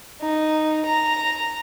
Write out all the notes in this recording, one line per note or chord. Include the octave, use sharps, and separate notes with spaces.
D#4
A#5